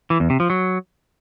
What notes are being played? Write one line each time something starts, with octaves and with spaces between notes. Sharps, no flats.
E3
E2
C3
F3
F#3